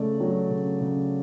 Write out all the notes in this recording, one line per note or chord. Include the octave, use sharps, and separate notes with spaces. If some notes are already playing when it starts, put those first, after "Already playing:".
Already playing: C#3 A3 D5
F#3
C#3
C#3